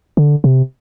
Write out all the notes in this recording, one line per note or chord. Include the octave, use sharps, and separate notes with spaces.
D3
C3